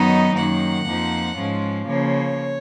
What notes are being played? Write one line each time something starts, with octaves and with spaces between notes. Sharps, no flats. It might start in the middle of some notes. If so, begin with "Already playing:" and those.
Already playing: F#2 D#3 F#3 B3 D#4 D#5
F#2 D#3 A#3 F#5
F2 F3 A#3 D#4
G#2 F3 G#3 C#4 F4
C#3 F3 A#3 C#5